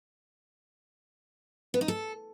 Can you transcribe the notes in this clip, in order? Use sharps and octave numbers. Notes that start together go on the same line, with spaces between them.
B3
D#4
A4